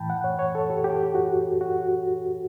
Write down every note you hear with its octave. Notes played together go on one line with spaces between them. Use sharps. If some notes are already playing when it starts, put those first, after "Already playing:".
Already playing: A2 E3 G5 A5 B5
F#5
C#5
C#5
A4
G4
G4
F#4
F#4